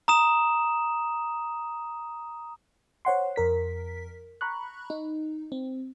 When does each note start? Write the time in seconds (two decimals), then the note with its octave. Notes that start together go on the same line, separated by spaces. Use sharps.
0.08 A#5 D#6 E7
3.05 C5 C#5 F#5 C6
3.36 F2 A#4 B6
4.41 A#5 B5 C#6 F#6
4.90 D#4
5.52 C4